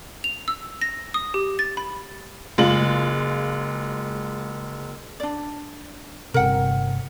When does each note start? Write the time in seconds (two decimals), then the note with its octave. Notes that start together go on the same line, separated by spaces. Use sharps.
0.24 F7
0.48 E6
0.81 A#6
1.14 D#6
1.34 G4
1.59 A6
1.77 B5
2.58 F#1 G#3 F4 F#7
5.20 D4 D5
6.34 G1 C3 A#4 F#5 G5